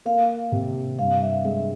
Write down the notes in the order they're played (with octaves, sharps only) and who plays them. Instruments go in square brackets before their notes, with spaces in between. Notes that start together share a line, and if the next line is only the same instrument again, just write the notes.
[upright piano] A#3 [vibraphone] F5
[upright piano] C3
[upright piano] G2 [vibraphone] F5
[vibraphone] E5
[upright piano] G#3 [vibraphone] E5